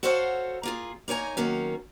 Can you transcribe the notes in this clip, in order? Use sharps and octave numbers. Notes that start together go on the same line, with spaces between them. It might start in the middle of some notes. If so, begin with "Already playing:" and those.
F#4 A4 C5 C#5 F5 F#5
A#3 F4 G#4
A#3 D#4 C#5 G#5 A#5
D#3 F#3 A#3 C#4